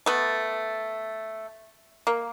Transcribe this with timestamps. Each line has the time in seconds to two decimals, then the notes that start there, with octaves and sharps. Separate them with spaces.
0.06 A3 B3
2.07 A#3